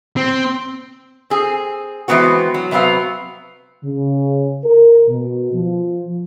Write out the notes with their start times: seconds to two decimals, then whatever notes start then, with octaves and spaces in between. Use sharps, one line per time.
0.17 C4
1.30 C4 G#4
2.08 E3 G#3 B3 C4 F#4
2.54 F#3
2.71 C3 F#3 B3 C4 F5
3.84 C#3
4.65 A#4
5.09 B2
5.53 F3